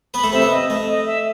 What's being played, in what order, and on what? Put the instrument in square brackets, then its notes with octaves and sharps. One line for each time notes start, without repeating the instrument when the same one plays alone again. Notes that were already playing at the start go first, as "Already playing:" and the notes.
[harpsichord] B3 B4 [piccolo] B5
[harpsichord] A3 A4
[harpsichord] C3 C4 [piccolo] E5
[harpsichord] B3
[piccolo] D#5
[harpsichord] A3
[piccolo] D#5
E5